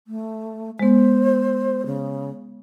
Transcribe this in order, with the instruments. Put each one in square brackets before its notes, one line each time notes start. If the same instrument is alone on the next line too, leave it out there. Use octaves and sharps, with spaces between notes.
[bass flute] A3
[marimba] G#3 B3 [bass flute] C5
[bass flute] C#3